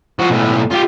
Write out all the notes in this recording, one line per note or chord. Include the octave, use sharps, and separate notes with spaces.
F3 F#4
B1 A2
F4 G4